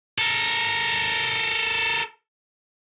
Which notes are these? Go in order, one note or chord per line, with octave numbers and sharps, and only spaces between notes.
A4 A#4